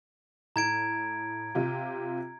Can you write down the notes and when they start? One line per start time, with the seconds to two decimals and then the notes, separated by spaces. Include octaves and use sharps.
0.56 A2 A#5 G#6 D7
1.55 C3 F4 G4